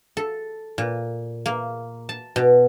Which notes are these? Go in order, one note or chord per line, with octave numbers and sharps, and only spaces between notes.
A4
A#2
A#3
A5
B2